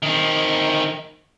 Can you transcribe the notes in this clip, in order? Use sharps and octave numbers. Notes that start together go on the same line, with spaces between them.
D#3 C4